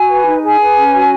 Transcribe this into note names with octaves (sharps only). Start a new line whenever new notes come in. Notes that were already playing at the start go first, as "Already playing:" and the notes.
Already playing: F#4 G#5
B4
D#4
G#4 G#5
B4
C#4
F#4